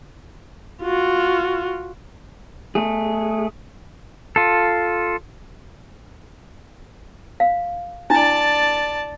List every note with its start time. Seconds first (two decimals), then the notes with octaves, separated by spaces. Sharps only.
0.82 F4 F#4
2.75 A3 G#4
4.36 F4 A4
7.40 F5
8.10 D4 E4 D5 A5